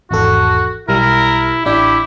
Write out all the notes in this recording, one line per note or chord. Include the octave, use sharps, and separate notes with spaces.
G#1 E2 F#4 A4
B1 G3 E4 A#4
A1 D4 E4 G4 E5